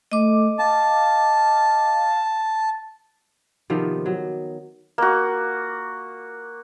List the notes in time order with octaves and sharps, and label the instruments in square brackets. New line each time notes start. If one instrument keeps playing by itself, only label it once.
[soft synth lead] A3 [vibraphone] D#5 D6
[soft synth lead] F5 [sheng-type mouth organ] A5
[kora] C3 D#3 F3 B3
F#3
[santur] A#3 F#4